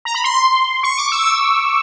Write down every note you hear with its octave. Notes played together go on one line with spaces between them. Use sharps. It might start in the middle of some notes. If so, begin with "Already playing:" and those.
A#5
B5
C6
C#6
D6
E6